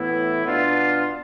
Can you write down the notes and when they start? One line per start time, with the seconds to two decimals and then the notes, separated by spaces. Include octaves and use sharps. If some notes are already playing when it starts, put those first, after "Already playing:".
Already playing: A2 E3 B3 E4
0.46 B2 B3 D4 F4